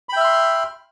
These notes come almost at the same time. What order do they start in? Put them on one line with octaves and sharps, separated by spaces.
B5 G5 E5 F6 C6